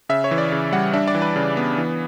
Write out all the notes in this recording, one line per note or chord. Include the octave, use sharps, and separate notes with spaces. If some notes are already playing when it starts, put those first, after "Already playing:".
C#3 E5
C#5
E3
D5
C#3
G3 F#5
D4 E5
D5
E3
B4
C#3
B3
E3